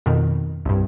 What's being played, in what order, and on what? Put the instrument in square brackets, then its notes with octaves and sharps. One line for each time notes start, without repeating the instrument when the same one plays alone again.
[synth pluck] F2 B2 D#3
C2 G2